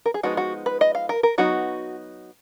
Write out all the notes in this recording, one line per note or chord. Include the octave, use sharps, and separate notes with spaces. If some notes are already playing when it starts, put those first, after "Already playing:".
A#4
G#4
F3 G#3 B3 D#4 F#4
F#4
B4
D#5
F5
A#4
A#4
F#3 B3 D#4 F#4